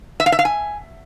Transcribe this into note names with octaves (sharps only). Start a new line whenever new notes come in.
E5
F5
E5
F5
G#5